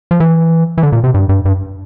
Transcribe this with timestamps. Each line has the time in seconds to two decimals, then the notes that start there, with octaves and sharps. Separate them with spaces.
0.11 F3
0.20 E3
0.78 E3
0.83 D3
0.92 A#2
1.04 C3
1.14 G2
1.29 G2
1.45 G2